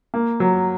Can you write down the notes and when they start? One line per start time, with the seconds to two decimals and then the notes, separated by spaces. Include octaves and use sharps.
0.14 A#3
0.40 F#3